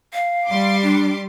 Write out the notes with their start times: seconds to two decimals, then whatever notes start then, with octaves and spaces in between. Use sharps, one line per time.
0.13 F5
0.48 G3 C6 D6
0.82 D4